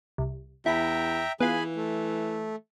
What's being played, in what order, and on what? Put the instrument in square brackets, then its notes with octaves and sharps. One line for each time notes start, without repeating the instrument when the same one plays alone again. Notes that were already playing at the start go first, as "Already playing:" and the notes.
[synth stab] C2
[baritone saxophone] E2 [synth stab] E4 B5 [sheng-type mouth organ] E5 G5 A#5
[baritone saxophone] E3 [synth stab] B3 F4 [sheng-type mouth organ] G#4 G#5 B5
[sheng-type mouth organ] A3